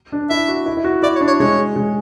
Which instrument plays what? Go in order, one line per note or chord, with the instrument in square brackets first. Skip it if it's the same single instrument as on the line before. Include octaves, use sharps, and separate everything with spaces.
[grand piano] D4
[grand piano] E4 [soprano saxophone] E5
[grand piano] F#4
E4
E4
F#4
[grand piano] E4 [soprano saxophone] D5
[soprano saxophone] C#5
[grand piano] D4
[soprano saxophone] C#5
[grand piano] G#3 [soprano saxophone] C#5
[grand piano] G#3